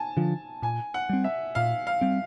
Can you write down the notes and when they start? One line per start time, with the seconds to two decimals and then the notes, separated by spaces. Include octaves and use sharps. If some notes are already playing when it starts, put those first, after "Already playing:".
Already playing: G#5 A5
0.17 D3 F3
0.62 A#2 G#5
0.94 F#5
1.09 G3 C4
1.24 E5
1.55 A#2 F5
1.87 F5
2.01 G3 C4